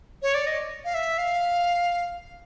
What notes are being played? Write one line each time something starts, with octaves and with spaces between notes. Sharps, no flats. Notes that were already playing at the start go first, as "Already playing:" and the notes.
C#5
D5
D#5
F5
E5
F5